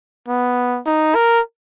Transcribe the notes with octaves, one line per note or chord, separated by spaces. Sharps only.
B3
D#4
A#4